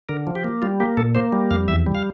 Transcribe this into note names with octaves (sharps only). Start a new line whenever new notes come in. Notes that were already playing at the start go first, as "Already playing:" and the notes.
D3 A#4
F3
G4
A#3
G3 F4
A#3 G4
A#2 A4
A#3 C5
G3
F2 F5
E2 E5
G3
F5